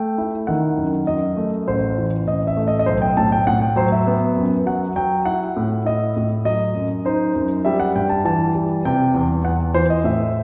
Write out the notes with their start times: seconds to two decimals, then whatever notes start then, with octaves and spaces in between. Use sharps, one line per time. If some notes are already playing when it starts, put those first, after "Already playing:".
Already playing: A3 G5
0.18 E4
0.47 D#3 F#5
0.78 F#2
1.07 F#2 D#5
1.37 A3
1.67 A1 C5
1.97 E3
2.27 A1 D#5
2.47 E5
2.57 A3
2.68 D#5
2.79 D#5
2.86 B1 C5
3.02 G5
3.17 A2 A5
3.32 G5
3.47 A2 F#5
3.62 G5
3.76 F#3 C5
3.92 E5
4.07 B3
4.36 F#2
4.66 F#3 F#5
4.96 F#3 G5
5.25 E4 F#5
5.56 A2
5.85 E4 D#5
6.16 A2
6.45 F#3 D#5
6.75 F#2
7.05 D#4 C5
7.35 F#2
7.65 G3 E5
7.80 F#5
7.96 G2 G5
8.09 A5
8.24 E3 A5
8.55 G3
8.85 C3 G5
9.14 E2
9.44 E2 F#5
9.74 E3 C5
9.90 D#5
10.04 A2 E5